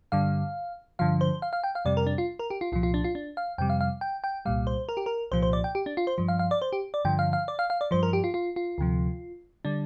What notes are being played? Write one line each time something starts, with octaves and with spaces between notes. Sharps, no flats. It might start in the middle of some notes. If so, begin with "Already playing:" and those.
G2 D3 G3 F5
G2 D3 F3 F5
C5
F5
F5
G5
F5
F2 C3 G3 D5
A#4
D4
F4
A#4
G4
F4
C2 A#2 F3 F4
F4
D4
F4
D4
F5
F2 C3 G3 G5
F5
F5
G5
G5
C2 A#2 G3 F5
C5
A#4
G4
A#4
C2 A#2 F3 C5
C5
D5
G5
G4
D4
F4
C5
G2 F3
F5
F5
D5
C5
G4
D5
G2 D3 F3 G5
F5
F5
D5
F5
F5
D5
G2 F3 C5
A#4
G4
F4
F4
F4
D2 C3 F3
D3 G3 D4